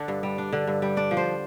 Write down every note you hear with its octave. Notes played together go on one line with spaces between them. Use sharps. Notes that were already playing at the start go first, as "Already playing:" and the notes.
Already playing: D3 D4
G2
G3
D4
D3
G2
G3
D4 D5
F3
C5